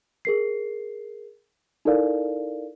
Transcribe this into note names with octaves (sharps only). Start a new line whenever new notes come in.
G#4 A#4 C7
D#4 E4 A4 A#4 D5 F5